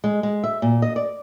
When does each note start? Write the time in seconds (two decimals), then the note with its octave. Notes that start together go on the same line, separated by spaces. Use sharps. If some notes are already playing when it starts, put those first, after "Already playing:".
0.04 G#3
0.23 G#3
0.44 E5
0.62 A#2
0.82 D#5
0.96 D5